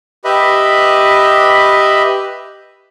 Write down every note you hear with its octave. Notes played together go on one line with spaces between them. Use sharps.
G4 B4 D#5 E5 B5